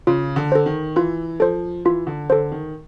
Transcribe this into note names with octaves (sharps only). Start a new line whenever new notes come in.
C#3 F4
D3
A4 C5
D#3
E3 F4
F3 A4 C5
E3 F4
D3
D3 A4 C5
D#3